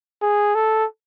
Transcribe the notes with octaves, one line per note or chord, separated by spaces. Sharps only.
G#4
A4